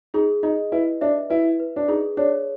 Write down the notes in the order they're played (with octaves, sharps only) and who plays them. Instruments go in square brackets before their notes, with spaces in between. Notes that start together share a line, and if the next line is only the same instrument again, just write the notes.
[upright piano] D#4 [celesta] G#4
[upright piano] D#4 [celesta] D#5
[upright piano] E4 [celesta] B4
[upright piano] D4 [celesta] E5
[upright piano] E4 [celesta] B4
[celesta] B4
[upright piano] D4
[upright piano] D#4 [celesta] G#4
[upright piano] D4 [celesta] C#5